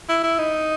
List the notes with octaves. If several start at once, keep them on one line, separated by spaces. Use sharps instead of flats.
E4
E4
D#4